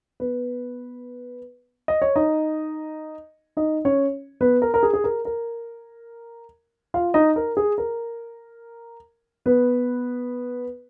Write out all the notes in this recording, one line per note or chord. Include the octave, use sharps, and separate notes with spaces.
B3 B4
D#5
C#5
D#4 D#5
D#4 D#5
C#4 C#5
B3 B4
A#4
A#4
G#4
G#4
A#4
A#4
F4 F5
D#4 D#5
A#4
G#4
A#4
B3 B4